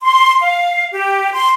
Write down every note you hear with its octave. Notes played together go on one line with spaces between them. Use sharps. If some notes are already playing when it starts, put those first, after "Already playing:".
C6
F5
G4
C6